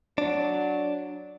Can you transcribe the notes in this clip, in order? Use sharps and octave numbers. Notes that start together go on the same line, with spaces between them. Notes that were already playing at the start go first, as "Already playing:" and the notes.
F#3 D4